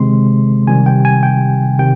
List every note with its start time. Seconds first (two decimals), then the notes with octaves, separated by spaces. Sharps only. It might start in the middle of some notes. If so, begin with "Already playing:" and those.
Already playing: C3 D#3 G#3 C4 C6
0.67 C3 D#3 G3 G#5
0.86 G5
1.05 G#5
1.23 G5
1.79 C3 D#3 G5